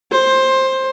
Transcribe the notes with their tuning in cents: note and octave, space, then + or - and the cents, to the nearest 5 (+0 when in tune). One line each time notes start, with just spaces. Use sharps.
C5 +15